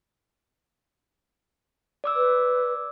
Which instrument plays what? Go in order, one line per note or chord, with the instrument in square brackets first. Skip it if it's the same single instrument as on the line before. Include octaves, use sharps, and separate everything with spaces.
[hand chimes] D5 D6 E6
[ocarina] B4